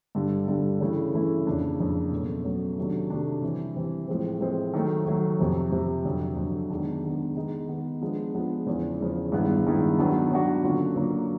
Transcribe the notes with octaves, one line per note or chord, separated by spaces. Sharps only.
G2 D3 G3
G2 D3 G3
C#3 E3 A3 C#4 E4
C#3 E3 A3 C#4 E4
F2 C#3 F3 A#3 D4
F2 C#3 F3 A#3 D4
B2 F#3 A3 C#4
B2 F#3 A3 C#4
C3 D#3 F#3 A3 D4
C3 D#3 F#3 A3 D4
E3 G3 C4
E3 G3 C4
A2 F3 G#3 C4
A2 F3 G#3 C4
D#3 F#3 A3
D#3 F#3 A3
F2 C3 F3
F2 C3 F3
F2 D3 F#3
F2 D3 F#3
D#3 G#3 B3 D4
D#3 G#3 B3 D4
D#3 G#3 B3 D#4
D#3 G#3 B3 D#4
F3 G#3 B3 D4 F4
F3 G#3 B3 D4 F4
E2 C#3 F3
E2 C#3 F3
G2 D#3 G#3 B3 E4
G2 D#3 G#3 B3 E4
D#3 F#3 B3 D4 F#4
D#3 F#3 B3 D4 F#4
D3 F#3 A#3 C#4 F4
D3 F#3 A#3 C#4 F4